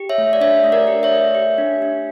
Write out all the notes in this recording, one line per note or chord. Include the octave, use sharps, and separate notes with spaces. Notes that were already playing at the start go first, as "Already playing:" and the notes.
Already playing: G4
C#5 E5
A3
D5
D4 C#5 E5
A3
A#4 D5
G4
C#5 E5
A3
G4
D4
D4